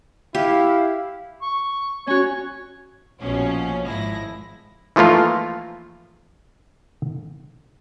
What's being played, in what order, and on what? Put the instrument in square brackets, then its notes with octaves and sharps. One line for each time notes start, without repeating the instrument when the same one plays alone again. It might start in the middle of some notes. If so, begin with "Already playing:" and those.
[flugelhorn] E4 [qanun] G4 [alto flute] F5
[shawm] C#6
[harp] C#4 F#4 [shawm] C#5
[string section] A#1 B2 F3 C#4
G#1 F3 G#3 E4 A#6
[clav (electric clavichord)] E3 F3 A3 A#3 F4